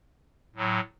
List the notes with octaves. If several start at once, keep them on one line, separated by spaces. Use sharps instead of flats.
A2 F#3